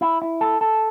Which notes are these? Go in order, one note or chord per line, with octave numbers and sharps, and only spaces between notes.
E4
E4
A4
A4